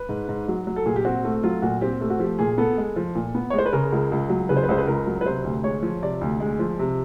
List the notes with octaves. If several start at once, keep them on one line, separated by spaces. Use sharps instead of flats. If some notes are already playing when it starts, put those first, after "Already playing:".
Already playing: B4
G#2
G#2
F#3
F#3
A4
A#2 G#4
G4
C4 F#4
A3
F#3 F4
A#2 F#4
C4 G4
A3 G4
F#4
F3 G4
A#2 G#4
B3 A4
G#3
F3
A#2
B3
C#5
G#3
C5
B4
C#3 A#4
C#2
C#2
F#3
C#3 B4
C5
B4
C#2 C5
B4
C#2 A#4
F#3
B4
C3 C5
D2
G#3 C#5
F3
C3 D5
D2
G#3
F3
C3